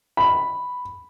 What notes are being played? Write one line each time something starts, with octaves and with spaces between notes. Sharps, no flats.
B5